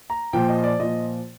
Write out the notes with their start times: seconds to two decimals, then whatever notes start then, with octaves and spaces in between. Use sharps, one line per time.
0.10 A#5
0.33 A#2 F3 G5
0.49 D#5
0.63 D5
0.80 A#2 F3 D#5